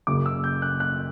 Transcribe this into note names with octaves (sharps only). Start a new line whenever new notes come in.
F#1 F#2 C#3 D6
E6
G6
F#6
F#6